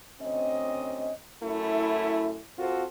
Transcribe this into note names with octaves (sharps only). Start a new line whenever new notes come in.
D2 C4 C#4 D#5
F#2 A3 E4
C4 F4 F#4 A4 C5